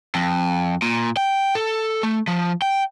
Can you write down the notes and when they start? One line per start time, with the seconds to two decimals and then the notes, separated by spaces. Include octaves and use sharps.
0.15 F2
0.82 A#2
1.17 G5
1.55 A4
2.03 A3
2.28 F3
2.62 G5